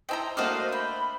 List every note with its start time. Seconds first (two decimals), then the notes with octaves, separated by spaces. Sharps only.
0.09 E4 C5 D#5 G5 G#5 A#5
0.37 A3 A#3 D4 F#4 C5 D#5 F5
0.72 G5 B5